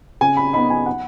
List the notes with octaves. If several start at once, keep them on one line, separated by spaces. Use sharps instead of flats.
C#3 G#5
B5
B3 D#4 B5
G#5
F#5